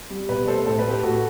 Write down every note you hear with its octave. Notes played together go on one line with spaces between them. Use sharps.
G3
B2 G4 B4
A3 A4 C5
A2 A4 C5
G4 B4
A2
G4 B4
A2 F#4 A4